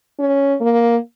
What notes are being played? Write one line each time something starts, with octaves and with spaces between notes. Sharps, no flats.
C#4
A#3